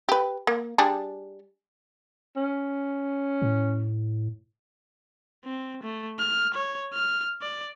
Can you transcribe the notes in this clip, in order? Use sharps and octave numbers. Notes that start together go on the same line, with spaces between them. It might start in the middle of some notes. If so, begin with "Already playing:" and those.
G4 B4
A#3
G3 D4 G#4
C#4
A2
C4
A3
F6
C#5
F6
D5